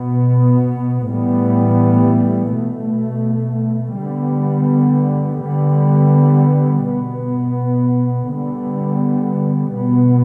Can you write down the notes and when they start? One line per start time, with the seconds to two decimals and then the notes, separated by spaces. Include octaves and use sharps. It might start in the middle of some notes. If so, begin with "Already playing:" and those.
Already playing: B2 B3
1.09 A2 E3 G3 B3
2.53 B2 A3
3.98 D3 G3 B3
5.42 D3 G3 B3
6.86 B2 B3
8.31 D3 G3 B3
9.75 B2 B3